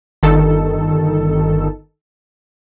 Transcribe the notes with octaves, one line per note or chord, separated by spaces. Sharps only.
G1 D#3 A4